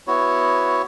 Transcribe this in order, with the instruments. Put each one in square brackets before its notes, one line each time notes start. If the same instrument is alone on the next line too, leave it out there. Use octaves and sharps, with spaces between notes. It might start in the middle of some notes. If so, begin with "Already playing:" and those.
[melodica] B3 E4 F#4 C#5